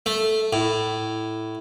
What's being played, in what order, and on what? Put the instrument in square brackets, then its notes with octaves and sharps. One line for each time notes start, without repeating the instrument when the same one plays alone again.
[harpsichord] A3
A2